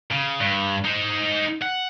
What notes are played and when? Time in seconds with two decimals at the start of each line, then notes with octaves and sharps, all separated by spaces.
0.11 C#3
0.40 G2
0.85 D#4 C5
1.62 F#5